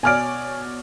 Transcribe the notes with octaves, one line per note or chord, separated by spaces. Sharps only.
B2 C#5 D5 G#5 F6 D7